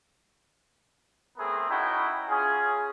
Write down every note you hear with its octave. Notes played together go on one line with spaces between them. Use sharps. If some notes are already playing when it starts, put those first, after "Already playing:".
A3 B3 C4 G#4 A#4
C#4 D#4 E4 F#4 G5
C#4 F4 G#4